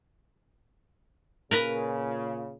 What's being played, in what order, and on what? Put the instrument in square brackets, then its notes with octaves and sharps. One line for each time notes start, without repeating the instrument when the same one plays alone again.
[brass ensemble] A#2 C#3 [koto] A#4 B4 A#5